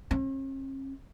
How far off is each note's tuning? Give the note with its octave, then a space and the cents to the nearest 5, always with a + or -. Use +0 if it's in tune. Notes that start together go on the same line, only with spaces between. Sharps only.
C#4 -45